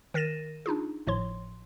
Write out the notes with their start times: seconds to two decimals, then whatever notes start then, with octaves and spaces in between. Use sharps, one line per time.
0.14 D#3 A#4 A6 A#6 D#7 E7
0.66 D4 D#4 F4 G#4
1.07 G#1 A2 F3 C#5 C6